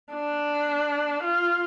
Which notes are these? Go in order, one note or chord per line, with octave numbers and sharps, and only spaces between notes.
D4
F4